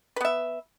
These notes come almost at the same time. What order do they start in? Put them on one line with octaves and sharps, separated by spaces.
B4 B3 E5